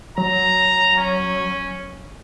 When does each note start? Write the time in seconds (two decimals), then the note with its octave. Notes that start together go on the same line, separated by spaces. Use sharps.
0.18 F#3 A#5
0.97 C#4